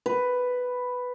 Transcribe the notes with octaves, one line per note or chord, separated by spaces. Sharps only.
B4